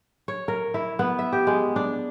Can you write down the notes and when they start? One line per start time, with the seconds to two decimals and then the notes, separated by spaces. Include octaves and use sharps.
0.28 C#5
0.48 A#4
0.74 E4
0.99 B3
1.19 E5
1.32 G4
1.47 G#3
1.76 D4